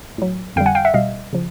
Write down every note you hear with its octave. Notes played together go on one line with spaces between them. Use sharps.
A2 F#3
F2 D3 G3 F5 G5
F#5 G#5
F5 G5
E5 F#5
B2 G3 D#5 F5
C#3 F3